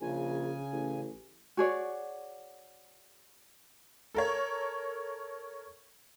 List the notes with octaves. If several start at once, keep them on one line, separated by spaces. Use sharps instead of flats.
A#1 C#3 G#5
A1
F#4 G#4 C#5 D5
A4 A#4 C#5